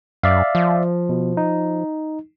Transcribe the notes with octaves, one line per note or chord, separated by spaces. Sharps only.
F#2 D5 E5 F5
F3
B2
D#4